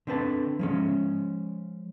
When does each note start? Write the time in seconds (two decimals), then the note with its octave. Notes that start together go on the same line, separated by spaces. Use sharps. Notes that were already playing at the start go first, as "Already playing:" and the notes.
0.07 D3 C4 B4 A5
0.59 F3 G#3 C#4